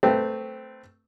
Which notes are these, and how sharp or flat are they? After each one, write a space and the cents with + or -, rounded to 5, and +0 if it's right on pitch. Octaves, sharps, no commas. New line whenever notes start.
A3 +10 C4 -5 B4 +0